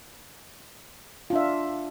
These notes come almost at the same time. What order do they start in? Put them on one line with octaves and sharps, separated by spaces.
F4 D4 E5